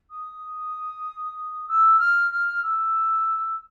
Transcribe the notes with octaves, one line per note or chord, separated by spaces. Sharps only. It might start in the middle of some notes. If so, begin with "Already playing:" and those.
D#6
E6
F6
F6
E6